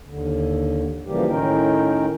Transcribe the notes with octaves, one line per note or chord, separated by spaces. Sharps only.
D#2 D3
C#3 E3 F3 G3 A#3 G4
A2 D#3 C#4 D#4 A#4 G5